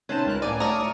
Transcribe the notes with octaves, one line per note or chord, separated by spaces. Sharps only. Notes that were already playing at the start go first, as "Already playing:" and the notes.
C3 D#3 C#4 B4 C5 A5
C#2 A#4 F#6
A2 A#3 D5 G5 G#5
F#3 A3 D5 A#5 C#6 D#6 F6